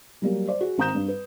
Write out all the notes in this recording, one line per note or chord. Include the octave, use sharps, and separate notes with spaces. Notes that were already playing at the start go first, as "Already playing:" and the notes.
F#3 G3 A#3
C5 D5
F#4 G#4
G#1 C4 A#5 D#6 G6 E7
G2
B4